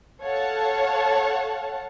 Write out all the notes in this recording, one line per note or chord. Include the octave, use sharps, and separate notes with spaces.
A4 C#5 F5 F#5 A5